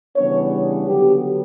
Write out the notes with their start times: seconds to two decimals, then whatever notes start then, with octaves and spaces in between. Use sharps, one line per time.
0.16 C#3 E3 G3 B3 D4 C#5
0.88 D3 F#3 B3 G4